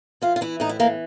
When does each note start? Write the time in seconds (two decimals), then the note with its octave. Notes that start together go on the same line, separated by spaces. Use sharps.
0.22 E3 F4
0.36 F4
0.41 E3 E4
0.60 A2 D#4
0.69 E4
0.79 E3 A#3